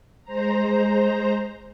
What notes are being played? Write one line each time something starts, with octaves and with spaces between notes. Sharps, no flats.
G#3 C5 A#5